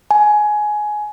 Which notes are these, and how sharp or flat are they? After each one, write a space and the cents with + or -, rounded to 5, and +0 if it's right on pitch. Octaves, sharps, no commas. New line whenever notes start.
G#5 +15